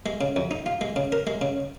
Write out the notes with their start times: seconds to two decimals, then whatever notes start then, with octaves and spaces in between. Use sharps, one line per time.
0.06 G#3
0.21 C#3
0.36 F2
0.51 D#4
0.66 F4
0.81 G#3
0.96 C#3
1.12 A#4
1.27 G#3
1.41 C#3